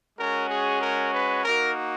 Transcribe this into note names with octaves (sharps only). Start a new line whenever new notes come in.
G#3 C#4 F#4 A#4
G#4
A#4
B4
A#3 D#4 F#4 A#4